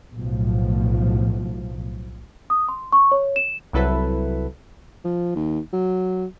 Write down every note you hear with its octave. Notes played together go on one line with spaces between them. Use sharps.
B1 A2 F3
D#6
C6
C#6
C#5
E7
C2 F#3 E4 A4 B4 E5
F3
D#2
F#3